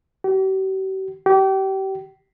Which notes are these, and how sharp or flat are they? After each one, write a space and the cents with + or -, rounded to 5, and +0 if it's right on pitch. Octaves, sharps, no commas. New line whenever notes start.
G4 -45
G4 -30